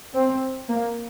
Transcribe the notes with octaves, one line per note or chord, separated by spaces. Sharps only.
C4
A#3